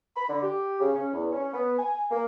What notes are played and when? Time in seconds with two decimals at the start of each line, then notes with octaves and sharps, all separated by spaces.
0.16 B5
0.28 D3
0.42 G4
0.80 C#3
0.94 C#4
1.13 E2
1.32 C#4
1.53 B3
1.78 G#5
2.11 A#3